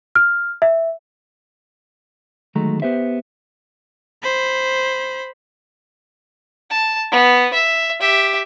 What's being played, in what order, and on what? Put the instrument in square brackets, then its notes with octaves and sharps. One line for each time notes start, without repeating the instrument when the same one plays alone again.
[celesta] F6
E5
[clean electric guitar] D2 D#3 F#3 G#3 A3 A#5
B3 G4 C5 E5
[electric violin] C5 B5
[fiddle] A5
B3
E5
G4 E5